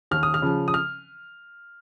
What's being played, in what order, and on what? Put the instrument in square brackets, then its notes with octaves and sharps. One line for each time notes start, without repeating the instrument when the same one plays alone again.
[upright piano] D#2 F6
D#6
F6
C#3 F3
D#6
F6